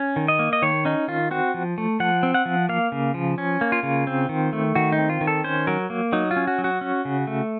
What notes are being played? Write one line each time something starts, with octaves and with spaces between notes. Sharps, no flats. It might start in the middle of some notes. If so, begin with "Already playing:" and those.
Already playing: C#4
D#3
D#5
A#3
D#5
D#3 C#5
C#4 D#4
D#3 F4
C4 F#4
F3
A3
F3 F#5
C4
F#5
F3
A#3 F5
C#3
F3
C#4
A#3
F4
C#3
C4
D#3
A3
D#3 F#4
D#4
C4
F4
D#3
A4
C#4 C5
F#3 A#4
A#3
F#3 D#4
F4
C#4
F#4
F#3
F#4
C#4
C#3
A3